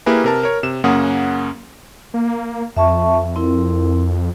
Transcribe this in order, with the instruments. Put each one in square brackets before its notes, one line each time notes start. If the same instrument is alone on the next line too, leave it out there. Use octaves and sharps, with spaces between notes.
[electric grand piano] A#3 E4 G4 G#4 A#4 B4
C3 A#4 A5
A#4 C#5
C3 E7
F#2 C#3 A#3 C#4 F#5 D#6
[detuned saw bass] A#3
[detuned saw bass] F2 [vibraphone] E5 A5 C#6
[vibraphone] C4 E4 A#4